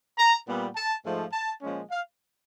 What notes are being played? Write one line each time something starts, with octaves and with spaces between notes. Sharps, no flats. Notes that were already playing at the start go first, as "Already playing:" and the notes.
A#5
A#2 G3 B3
A5
G#2 F3 A3
A5
A#2 F3 G#3 C#4
F5